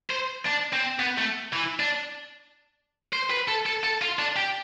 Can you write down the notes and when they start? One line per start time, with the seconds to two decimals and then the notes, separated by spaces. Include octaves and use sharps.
0.11 C5
0.46 D4
0.73 C4
0.99 B3
1.18 A3
1.53 E3
1.79 D4
3.13 C5
3.30 B4
3.48 A4
3.66 A4
3.84 A4
4.02 F4
4.19 D4
4.36 G4